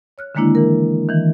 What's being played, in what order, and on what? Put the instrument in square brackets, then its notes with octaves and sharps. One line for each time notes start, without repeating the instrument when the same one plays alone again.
[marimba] C#5 F6 F#6
D3 D#3 G#3 A#3 D4 E4
E3 A#4
D#3 E3